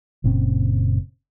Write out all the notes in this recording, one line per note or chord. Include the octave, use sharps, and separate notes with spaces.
F#1 A#2 C4 C#4